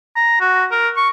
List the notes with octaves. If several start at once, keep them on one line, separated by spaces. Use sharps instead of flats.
A#5
F#4
A#4
C#6